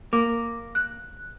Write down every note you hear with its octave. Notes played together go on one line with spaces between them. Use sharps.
A#3 D6
F#6